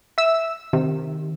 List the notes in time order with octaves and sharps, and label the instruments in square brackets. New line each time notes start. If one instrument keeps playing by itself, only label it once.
[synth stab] E5 E6
[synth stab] C3 [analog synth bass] D#3